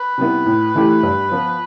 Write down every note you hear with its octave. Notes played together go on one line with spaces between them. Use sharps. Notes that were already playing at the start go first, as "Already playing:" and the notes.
Already playing: B4
C3 G3 B3 E4
A2
E3 A3 E4 G4
G2
F3 B3